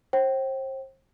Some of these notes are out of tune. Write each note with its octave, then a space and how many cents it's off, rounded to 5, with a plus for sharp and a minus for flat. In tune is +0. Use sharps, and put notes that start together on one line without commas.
C5 +35 G5 -30